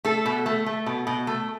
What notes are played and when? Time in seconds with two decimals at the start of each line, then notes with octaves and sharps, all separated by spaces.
0.05 A3 A4
0.26 B2
0.46 A3
0.66 A3
0.86 B2
1.07 B2
1.27 A3